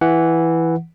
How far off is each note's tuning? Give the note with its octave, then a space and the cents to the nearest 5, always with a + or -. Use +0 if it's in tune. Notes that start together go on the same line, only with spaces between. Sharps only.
E3 +0 F#5 +0